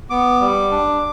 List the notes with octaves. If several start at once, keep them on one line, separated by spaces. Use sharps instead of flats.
B3 D6
G3
D4